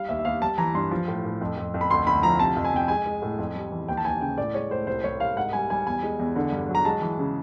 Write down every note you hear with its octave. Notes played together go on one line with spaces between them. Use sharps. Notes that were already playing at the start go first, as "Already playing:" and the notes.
Already playing: G3 F5
D#2 E5
E5
D#2 F5
G3 A5
E3 A#5
G2 C6
F3
A2
A2
F2
F2
F2
B5
D2 C6
D2 B5
F3 A#5
C3 A5
F2
G#5
C3 G5
G#3 G#5
G#3
A2
F2
G3
E3
D#2 G5
A5
D#2 G#5
C#3 G5
A2 D5
G#3 C#5
A2 C5
C2 C5
C2 C#5
C2 F5
G#2 F#5
G3 G#5
G3 G#5
E2 G#5
G#3
E2
D3
G2
F#3
A#5
G#3 A5
E3
C#3